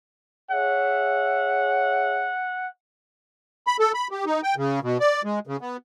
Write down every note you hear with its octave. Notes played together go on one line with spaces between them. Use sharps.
G#4 C#5 E5 F#5
B5
A4
B5
G4
D#4
G5
C#3
B2
D5
G#3
C#3
B3